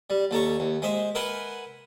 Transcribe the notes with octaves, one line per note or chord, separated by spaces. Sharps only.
G3
D#2 A4 A#5 C#6
D#2
G#3 C5 E5
A#4 B4 E5 F#5 G#5 C6